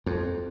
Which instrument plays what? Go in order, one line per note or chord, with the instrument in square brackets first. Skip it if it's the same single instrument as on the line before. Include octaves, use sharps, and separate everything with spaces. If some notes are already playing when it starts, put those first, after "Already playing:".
[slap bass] F2